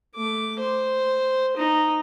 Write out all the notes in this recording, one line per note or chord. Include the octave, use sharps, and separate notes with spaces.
A3 D6
C5
D#4